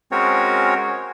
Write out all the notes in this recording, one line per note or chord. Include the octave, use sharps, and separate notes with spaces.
G#3 C4 C#4 F#4 A#4 C#5